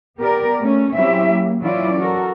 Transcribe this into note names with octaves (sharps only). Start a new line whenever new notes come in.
B3 G4 A#4 D5
A3 C#4
F#3 C4 C#4 E4 G4 E5
A#3
E3 F#3 C#4 E4 F4 D5
F#4 A4 A#4